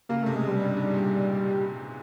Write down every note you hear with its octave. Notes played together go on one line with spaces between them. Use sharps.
C#3 A#3
C3 A3
G#3
B2 G3
G2
G#2
A#2